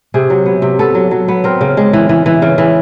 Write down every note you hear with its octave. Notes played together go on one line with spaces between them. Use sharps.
C3 G#4
F#3
B3
C3
B3 A4
F#3
F#3
B3
C4 A#4
C#3
G#3
E3
E3
E3
C#3
E3